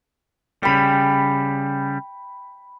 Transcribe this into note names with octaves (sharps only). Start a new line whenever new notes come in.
C#3 G3 G5 B5